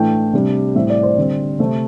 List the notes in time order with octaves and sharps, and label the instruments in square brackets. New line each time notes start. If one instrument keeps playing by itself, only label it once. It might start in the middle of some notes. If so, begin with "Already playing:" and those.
Already playing: [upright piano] A2 E3 A3 D4 G5
C3 G3 D4
A2 G3 C4 E5
D5
C5
D3 G3 C4
C3 A3 C4